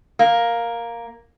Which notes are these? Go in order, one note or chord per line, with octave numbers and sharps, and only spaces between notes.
A#3